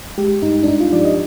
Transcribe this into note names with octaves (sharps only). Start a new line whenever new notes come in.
G#3 G4
G2 D#4
D4
G2 D#4
F4
F3 D5
D#5